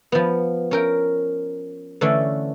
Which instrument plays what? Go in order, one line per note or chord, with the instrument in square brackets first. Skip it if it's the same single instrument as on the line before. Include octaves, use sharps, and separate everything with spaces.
[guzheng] F3 B3
C#4 A#4 G5
D3 E3 A3 C#4 D4